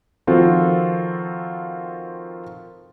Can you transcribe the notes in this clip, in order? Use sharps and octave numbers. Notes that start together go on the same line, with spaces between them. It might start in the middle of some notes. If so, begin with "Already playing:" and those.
D#3 F3 C4 F4 F#4 A4